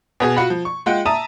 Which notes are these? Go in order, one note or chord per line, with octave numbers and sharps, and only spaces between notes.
B2 B3 G#4
F4 F#4 F#5 B5
F3
C#6
G#3 F4 F#5 G5
E5 A5 A#5 D#6 D#7